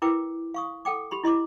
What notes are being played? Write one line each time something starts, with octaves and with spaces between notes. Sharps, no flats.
E4 A#4 B4 G5 D6
F5 C#6 D#6
A4 F#5 G5 D6
G4 B5 C6
E4 D#5 C6 D6